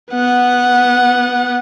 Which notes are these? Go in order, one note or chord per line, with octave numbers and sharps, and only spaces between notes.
B3 F#5